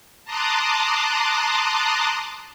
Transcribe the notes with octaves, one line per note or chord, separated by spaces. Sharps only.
A5 A#5 C6 D6 D#6 F#6